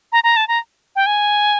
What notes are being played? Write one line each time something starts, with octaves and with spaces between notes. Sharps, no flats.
A#5
A#5
A5
A#5
G5
G#5